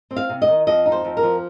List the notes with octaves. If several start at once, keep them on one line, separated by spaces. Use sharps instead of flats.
C4
F5
C3
D#5
D#3
F2 D#5
D#4
C5
F2
A#4
F3